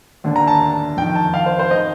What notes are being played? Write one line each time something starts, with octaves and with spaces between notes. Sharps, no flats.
D#2 D3
A#5
A5
F2 D#3 G5
A5
F5
C5
C5
D#3 D#5